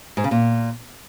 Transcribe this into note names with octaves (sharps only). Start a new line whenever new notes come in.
G#2
C#3
A#2